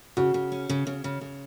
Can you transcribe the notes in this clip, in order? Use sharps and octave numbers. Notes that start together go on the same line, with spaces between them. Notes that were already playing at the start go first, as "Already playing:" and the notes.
C#3 F#4
C#3
C#4
C#3
C#3
C#3
C#3